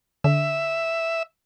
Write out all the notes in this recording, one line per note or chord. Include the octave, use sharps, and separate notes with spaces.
D3 E5